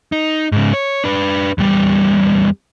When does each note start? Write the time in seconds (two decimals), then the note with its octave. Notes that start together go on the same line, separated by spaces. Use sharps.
0.12 D#4
0.52 G#2 C#3
0.73 C#5
1.04 D4 B4
1.58 E2 G3